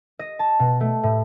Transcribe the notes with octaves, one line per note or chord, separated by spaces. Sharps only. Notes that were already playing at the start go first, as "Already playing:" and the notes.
D#5
A5
B2
A3
A2